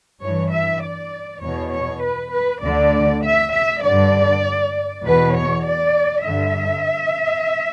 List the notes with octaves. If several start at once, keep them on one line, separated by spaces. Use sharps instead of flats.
G2 E3 C#5
E5
D5
E2 B2 C#5
C#5
B4
B4
D2 D3 D5
E5
E5
G2 D3 D5
E2 B2 B4
C#5
D5
G2 D3 E5